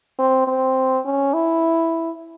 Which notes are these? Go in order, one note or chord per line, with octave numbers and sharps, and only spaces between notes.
C4
C4
C#4
E4